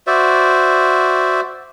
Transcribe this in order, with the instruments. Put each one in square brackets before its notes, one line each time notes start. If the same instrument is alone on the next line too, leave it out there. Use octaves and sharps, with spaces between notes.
[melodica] F#4 C5 D5 E5